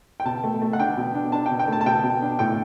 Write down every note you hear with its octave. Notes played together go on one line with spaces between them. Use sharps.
G5
B2 A5
A3
A3
F#5
D4 G5
B2
D4
D4 A5
G5
B2
G5
A3 A5
A5
B2 G5
B2
D4
A2 G5